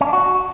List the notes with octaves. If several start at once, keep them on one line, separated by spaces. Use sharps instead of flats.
C#4
D4
F#4